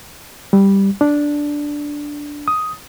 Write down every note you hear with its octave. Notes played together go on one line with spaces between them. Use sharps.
G3
D4
D#6